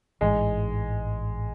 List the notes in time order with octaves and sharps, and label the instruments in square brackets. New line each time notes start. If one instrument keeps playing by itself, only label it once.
[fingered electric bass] A1 G#2 E3 [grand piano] G#3